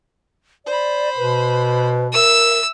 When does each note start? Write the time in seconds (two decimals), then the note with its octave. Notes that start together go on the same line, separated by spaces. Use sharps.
0.66 C5 D5 B5
1.17 B2 B4
2.13 A#4 E5 E6